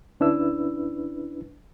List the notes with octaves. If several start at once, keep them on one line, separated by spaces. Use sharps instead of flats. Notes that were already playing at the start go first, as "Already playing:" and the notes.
D2 C#4 D4 E4 B4 E6